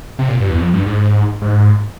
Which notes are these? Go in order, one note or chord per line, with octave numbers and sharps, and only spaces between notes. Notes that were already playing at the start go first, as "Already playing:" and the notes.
C3
A#2
G2
E2
F2
G2
G#2
G#2